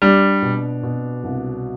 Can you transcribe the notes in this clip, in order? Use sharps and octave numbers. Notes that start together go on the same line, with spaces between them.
G3 D4
B2
B2
C2